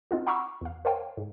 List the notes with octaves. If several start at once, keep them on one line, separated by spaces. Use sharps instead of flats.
C4 D#4 F4 F#4
F#5 A#5 B5 C#6 D6 E6
E2 F5
A#4 C5 C#5 F5 G5
G#2